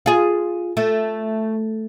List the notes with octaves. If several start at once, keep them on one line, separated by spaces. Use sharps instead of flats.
F4 G#4
A3